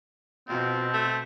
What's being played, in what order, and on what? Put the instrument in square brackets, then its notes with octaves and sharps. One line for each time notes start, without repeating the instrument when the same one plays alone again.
[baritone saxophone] F2 [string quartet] B2 [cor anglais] C4
[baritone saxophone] A3